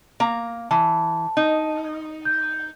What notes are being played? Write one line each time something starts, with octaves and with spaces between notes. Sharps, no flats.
A#3 A#5
E3 A5
D#4
G6